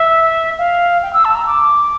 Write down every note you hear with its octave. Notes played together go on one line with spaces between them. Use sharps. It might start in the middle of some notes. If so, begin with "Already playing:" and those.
Already playing: E5
F5
G5
E6
A5
A#5
D6